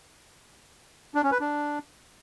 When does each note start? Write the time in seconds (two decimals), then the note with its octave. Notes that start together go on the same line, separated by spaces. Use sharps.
1.15 D4
1.23 C#4
1.32 B4
1.40 D4